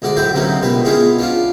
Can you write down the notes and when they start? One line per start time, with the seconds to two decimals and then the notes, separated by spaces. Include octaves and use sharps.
0.02 D2 G#2 F#4 D5
0.16 A2 F#3 B4 C5 E5
0.34 D2 C3 F#3 A#3 C#4 D#4
0.61 C#2 B2 D#3 B4
0.85 G#3 B3 C#4 E4 F4 G#4
1.19 C#4 D4 F4